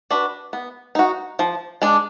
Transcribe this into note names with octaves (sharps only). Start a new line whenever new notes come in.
D4 F#4 B4
B3
D#4 F#4
F3
G#3 D4